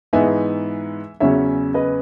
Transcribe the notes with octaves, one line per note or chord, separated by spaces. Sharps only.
G#2 E3 B3 D#4 E5 G#5
E2 C#3 F#3 C#4 C#5 E5
B4 D#5